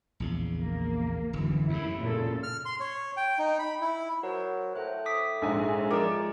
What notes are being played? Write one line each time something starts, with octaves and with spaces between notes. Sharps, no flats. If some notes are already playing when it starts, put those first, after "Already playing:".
A#1 E2 C#3
A#3
G1 F#2 E3
D#2 A2 E4
A#2 C#3 A4
F6
C6
C#5
G5
D#4
B5
E4
F#3 A#4 C5
A2 A4 C5 F#6
D6 D#6 B6
A#1 G#2 G#3 G#5
F3 A#4 D5 D6 C#7